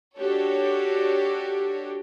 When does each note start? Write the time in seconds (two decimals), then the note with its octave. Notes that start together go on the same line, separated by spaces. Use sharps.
0.17 D4 F#4 G4 A4 C#5